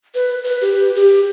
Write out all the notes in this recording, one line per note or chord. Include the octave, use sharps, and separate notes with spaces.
B4
B4
G4
G4